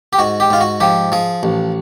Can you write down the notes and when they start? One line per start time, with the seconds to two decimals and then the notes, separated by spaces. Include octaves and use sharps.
0.13 G4
0.19 G#2 F#4
0.40 G4
0.50 G#2 F4
0.61 F#4
0.80 F3 G4
1.12 F3 G#4
1.43 A1